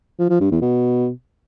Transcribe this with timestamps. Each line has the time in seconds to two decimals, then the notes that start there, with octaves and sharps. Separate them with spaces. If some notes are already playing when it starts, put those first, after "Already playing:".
0.19 F3
0.30 F3
0.40 G2
0.51 E2
0.62 B2